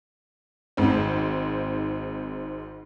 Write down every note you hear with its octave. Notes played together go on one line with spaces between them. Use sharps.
G#1 G#2 C4